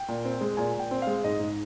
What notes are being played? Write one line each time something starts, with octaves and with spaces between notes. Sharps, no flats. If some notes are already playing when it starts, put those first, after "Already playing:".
Already playing: G5
A#2
C4
G#3
A#2 G#5
A#2
G5
C4
G#3 F5
G#2 D#5
G#2